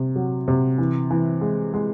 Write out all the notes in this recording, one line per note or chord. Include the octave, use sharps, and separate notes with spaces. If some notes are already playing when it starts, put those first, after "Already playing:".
Already playing: C3
F#3
C3
E3
E3
G#3
G#3